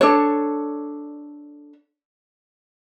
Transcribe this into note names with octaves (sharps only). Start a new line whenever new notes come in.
D4 A4 C#5